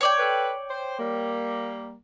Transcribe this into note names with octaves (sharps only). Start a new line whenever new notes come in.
C#5 D5 G5
A4 B4
C5
G3 A#3